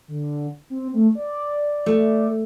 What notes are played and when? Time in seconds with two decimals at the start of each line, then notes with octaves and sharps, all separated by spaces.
0.08 D3
0.70 C4
0.94 A3
1.15 D5
1.86 A3